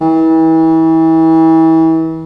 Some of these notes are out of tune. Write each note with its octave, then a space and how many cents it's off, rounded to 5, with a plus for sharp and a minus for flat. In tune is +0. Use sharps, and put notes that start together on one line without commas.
E3 -35